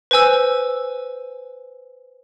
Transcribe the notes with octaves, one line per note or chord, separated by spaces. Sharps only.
B4 C5 G#5 E6